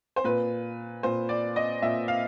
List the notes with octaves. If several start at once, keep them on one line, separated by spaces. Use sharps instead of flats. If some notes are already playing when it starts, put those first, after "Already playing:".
C5
A#2 B4
A#2 C5
D5
D#5
A#2 E5
F5